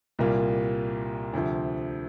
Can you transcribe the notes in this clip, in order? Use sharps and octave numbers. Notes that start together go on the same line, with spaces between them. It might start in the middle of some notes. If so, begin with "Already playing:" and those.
C2 A#2 G3 A#3 F4
D2 C3 F3